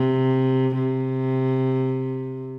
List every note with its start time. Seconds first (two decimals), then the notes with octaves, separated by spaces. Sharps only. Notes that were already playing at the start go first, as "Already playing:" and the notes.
Already playing: C3
0.75 C3